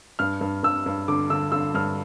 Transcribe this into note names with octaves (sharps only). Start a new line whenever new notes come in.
G2 F6
G2
G2 E6
G2
D3 D6
D3 E6
D3 E6
G2 F6